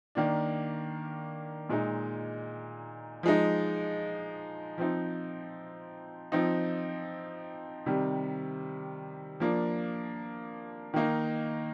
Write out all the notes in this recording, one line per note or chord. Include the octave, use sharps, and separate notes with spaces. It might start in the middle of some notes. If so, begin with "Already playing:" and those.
D#3 A#3 D4
A#2 G#3 D#4
F3 G#3 D#4
F3 C4 D#4
F3 C4 D#4
C3 D#3 G3
F3 A#3 D4
D#3 A#3 D#4